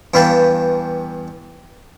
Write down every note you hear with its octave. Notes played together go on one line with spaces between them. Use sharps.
E2 G2 B4 F5 G5 A5